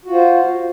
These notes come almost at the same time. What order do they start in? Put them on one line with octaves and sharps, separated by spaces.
F#4 F4 C5